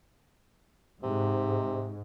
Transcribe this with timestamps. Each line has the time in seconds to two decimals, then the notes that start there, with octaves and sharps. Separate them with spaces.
1.03 G#2 C3